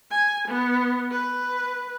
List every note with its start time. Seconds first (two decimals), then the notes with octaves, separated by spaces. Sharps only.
0.11 G#5
0.49 B3
1.11 B4